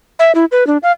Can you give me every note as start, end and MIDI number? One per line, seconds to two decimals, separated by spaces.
0.19 0.32 76
0.35 0.45 64
0.52 0.66 71
0.67 0.77 62
0.83 0.92 77